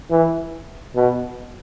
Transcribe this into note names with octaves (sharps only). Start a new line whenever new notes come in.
E3
B2